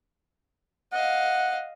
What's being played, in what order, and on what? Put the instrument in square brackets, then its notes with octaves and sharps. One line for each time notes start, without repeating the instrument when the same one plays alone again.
[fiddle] D#5 F5 [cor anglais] F#5